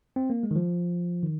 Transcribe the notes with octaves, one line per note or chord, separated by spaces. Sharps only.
C4
A#3
G#3
D#3
F3
D#3